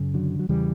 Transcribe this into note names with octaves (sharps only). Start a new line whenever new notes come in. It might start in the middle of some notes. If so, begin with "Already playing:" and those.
Already playing: F#2 C#3
D3 F#3
F#3
E2 C#3 E3 G3